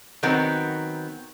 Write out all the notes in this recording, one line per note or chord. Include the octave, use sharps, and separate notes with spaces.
D#3 F#3 B3 C4 A#4